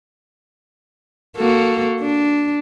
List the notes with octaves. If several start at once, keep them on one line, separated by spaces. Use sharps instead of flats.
A#3 F#4 A4
D4